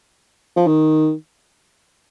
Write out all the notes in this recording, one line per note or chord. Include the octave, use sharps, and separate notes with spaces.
F3
D#3